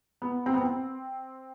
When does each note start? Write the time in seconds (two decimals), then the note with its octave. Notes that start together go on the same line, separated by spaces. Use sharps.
0.22 B3
0.46 C4
0.54 B3
0.61 C4